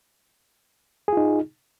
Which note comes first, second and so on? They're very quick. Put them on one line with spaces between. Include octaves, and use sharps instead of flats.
G#4 F4 D#4